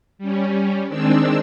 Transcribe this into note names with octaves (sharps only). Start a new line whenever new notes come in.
G3 C#4
D#3 G#3 C4 D4 E6